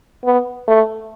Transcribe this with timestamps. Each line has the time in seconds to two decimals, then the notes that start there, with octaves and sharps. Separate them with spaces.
0.25 B3
0.67 A3